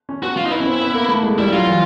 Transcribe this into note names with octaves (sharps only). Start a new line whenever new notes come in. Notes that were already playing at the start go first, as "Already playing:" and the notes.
C#4
B3 F#4
F4
D#4
B3 E4
C#4
C4
B3
A#3
A3
G#3
G3 E4
F#3 F4
E3